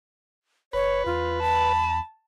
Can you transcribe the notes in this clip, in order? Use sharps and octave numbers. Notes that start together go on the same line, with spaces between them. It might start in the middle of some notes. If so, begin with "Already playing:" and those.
F#1 B4 C#5
E2 F4
A5 B5